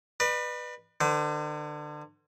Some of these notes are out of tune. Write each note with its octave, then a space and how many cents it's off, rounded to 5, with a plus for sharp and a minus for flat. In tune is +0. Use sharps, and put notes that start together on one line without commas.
B4 -10 D5 +40
D3 +35 C5 -45